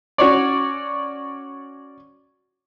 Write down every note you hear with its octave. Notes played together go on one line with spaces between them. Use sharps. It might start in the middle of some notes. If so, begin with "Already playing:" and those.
C#4 F#4 C#5 D5